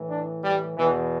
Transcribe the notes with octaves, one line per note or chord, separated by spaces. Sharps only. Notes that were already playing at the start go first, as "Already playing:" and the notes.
Already playing: A2 E3
D4
G3
E2 B2 E3